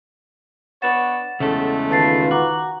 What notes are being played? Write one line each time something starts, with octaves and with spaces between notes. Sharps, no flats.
B3 D4 C#5 F#5 A6 E7
E2 C#3 G#3 A3 A4
D#3 F4 B4 A5 A6 C7
F#4 A#5 D6